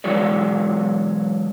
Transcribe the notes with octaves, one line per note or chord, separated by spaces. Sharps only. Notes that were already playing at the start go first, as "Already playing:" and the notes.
E3 F#3 G#3 F#4 C#5 D5